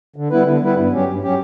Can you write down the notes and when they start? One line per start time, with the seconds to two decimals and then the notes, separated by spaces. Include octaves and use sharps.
0.16 D3
0.30 G3 B3 E4 B4
0.46 D3
0.61 G3 B3 E4 B4
0.76 G2
0.92 F#3 C#4 G4
1.07 G2
1.22 F#3 C#4 G4